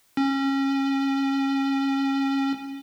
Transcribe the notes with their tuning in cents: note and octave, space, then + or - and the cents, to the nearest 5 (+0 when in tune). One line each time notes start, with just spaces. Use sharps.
C#4 -25